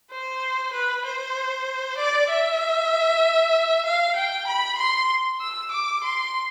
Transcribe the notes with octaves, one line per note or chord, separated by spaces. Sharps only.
C5
B4
C5
D5
E5
F5
G5
B5
C6
E6
D6
C6